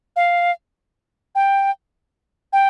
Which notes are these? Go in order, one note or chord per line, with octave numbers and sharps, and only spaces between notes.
F5
G5
G5